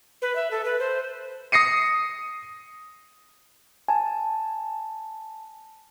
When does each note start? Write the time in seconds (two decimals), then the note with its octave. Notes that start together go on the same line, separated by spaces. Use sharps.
0.22 B4
0.36 E5
0.51 A4
0.65 B4
0.79 C5
1.52 D#6 A#6 C7 C#7 D#7
3.88 G#5 A5